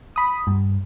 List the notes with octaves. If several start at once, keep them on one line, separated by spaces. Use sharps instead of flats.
B5 D#6
G2